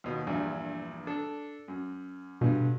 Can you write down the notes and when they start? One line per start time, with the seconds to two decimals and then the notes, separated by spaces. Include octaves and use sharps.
0.04 D#2 B2
0.27 A#1 E2 G2
1.07 D4 A4
1.68 F#2
2.41 G2 B2 D3